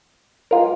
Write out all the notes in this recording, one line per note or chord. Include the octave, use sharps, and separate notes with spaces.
G#3 F4 A#4